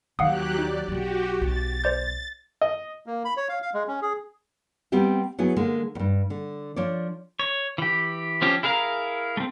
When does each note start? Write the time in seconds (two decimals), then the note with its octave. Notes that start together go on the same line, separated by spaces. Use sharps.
0.19 D#2 F#3 G4 F5 F#5 D#6 F#6
0.58 D#4 D5
0.88 B1 F#3 F#4 G4
1.41 B1 A6
1.84 C5 D5 G6
2.61 D#5
3.06 A#3
3.25 B5
3.37 C#5
3.49 F5
3.62 F5
3.74 G#3
3.88 C#4
4.02 G#4
4.92 G3 B3 C4 G4 E5
5.39 F#3 B3 E4 G#4
5.56 D3 G#3 A#3
5.95 E2 G2
6.30 D3
6.76 F3 D4 C#5 D5
7.40 C#5
7.78 E3 G4
8.42 F3 C4 C#4 G4
8.63 E4 G#4 A#4 F5 A#5
9.37 A3 C4